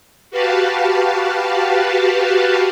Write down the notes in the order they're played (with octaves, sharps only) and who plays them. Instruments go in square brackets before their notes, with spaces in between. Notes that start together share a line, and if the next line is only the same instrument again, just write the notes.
[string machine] F#4 G4 B4 F5 A5